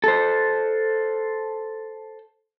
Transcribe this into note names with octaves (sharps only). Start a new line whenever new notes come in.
A4 C5